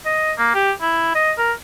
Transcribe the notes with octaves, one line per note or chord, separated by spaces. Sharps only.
D#5
A#3
G4
E4
D#5
A#4